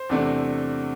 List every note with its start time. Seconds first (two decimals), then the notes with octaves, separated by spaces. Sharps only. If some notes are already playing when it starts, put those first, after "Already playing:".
Already playing: C5
0.09 E2 C3 A3 D4